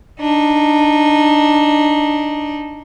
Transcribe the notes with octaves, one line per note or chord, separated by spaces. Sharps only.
D4 D#4